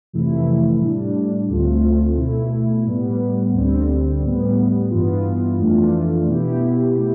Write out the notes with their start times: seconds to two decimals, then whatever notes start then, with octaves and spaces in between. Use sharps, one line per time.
0.13 F2 C3 E3 A3 E4
0.81 A2 G3 D4
1.49 D2 D3 A3 C4 F4
2.17 B2 A3 E4
2.86 A2 G3 B3
3.54 D2 D3 G3 C4
4.22 A2 G3 B3
4.91 G2 E3 B3 F4
5.59 F2 E3 A3 D4 F4
6.27 B2 B3 E4 G4
6.96 B2 A3 E4 G4